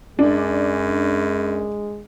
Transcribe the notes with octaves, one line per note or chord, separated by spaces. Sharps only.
F#2 G#3 D4